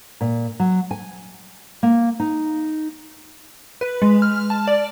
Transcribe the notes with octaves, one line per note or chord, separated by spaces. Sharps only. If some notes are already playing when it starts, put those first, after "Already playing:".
A#2
F#3
G#5
A#3
D#4
B4
G#3
F6
A5
D5